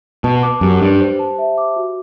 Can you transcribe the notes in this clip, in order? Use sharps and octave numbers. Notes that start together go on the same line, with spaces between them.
B2 A5
D6
F#2 G4
G2 G4
C5
A5
E5
D6
F#4